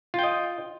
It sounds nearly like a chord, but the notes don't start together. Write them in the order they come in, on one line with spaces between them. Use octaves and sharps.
F4 G5 D#5